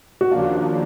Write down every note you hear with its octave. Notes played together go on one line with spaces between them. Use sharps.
F#4
D#2 C#3 F3 A#3 D4 F4
F4